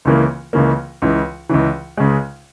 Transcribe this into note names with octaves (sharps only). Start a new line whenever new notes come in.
C#2 C#3 E3 A#3
C#2 C#3 E3 A#3
C#2 C#3 E3
C#2 C#3 E3
C#2 C#3 G#3